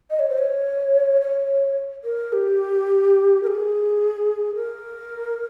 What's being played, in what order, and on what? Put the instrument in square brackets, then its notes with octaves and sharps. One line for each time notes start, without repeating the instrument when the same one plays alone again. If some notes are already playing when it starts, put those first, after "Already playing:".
[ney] D#5
C#5
C5
C#5
C#5
A#4
G4
A#4
G#4
A#4